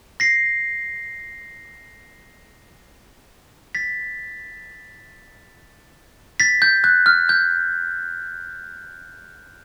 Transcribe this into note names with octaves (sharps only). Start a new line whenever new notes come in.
A#6 C7
A6 B6
A6 B6
G6
F#6
F6
G6